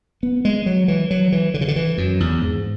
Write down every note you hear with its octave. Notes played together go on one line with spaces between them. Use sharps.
B3
G#3
F#3
E3
F#3
E3
D3
C#3
D3
E3
F#2
E2
G#2